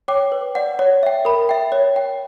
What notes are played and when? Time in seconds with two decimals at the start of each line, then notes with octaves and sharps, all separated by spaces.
0.08 C#5 G5 D6
0.32 B4
0.55 D5 F#5
0.79 C#5
1.03 E5 G5
1.25 A#4 B5
1.49 E5 G5
1.72 C#5
1.96 G5